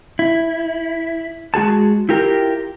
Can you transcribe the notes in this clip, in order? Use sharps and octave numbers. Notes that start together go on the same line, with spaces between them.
E4
G#3 F#4 G#4 A5
E4 F4 G4 A#4